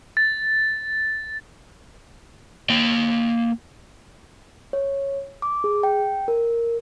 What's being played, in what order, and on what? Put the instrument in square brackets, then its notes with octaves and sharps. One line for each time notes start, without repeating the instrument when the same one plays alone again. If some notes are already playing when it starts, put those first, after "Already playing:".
[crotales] A6
[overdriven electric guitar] A#3 G5
[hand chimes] C#5
D6
G#4
G5
A#4